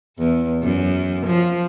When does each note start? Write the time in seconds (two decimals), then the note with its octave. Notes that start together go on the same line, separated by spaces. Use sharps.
0.18 E2
0.63 F#2
1.26 F3